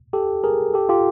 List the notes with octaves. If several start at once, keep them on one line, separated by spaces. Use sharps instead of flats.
G4 A4
G#4 A#4
G4 A4
F4 G4